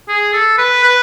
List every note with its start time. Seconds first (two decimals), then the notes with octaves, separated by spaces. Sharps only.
0.09 G#4
0.33 A4
0.58 B4
0.84 B4